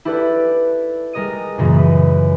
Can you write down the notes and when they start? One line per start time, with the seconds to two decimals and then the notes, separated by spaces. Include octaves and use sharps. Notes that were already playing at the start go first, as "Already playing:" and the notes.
0.05 E4 G4 A4 B4 D5 D6
1.13 G3 G#3 A#4 D#5 D#6 D#7
1.58 F#2 A#2 C#3 E3
1.73 B4